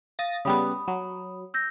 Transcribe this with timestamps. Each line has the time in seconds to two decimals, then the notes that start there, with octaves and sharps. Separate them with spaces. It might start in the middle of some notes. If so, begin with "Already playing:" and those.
0.19 F5 D#6 A6 A#6
0.45 C#3 G3 B3 B5 D#6
0.88 F#3
1.54 E6 G6 A#6